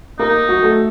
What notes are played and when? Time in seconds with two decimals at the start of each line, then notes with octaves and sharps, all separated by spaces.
0.19 A#3 D#4 A#4
0.48 F#3 F#4
0.62 A3 A4